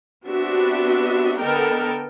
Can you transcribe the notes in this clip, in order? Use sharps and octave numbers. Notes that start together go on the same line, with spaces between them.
B3 C4 D4 F#4 G4 E5
D3 B3 A4 A#4 D#5 G5